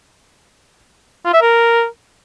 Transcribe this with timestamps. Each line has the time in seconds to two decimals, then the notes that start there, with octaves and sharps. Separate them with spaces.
1.25 F4
1.33 E5
1.41 A#4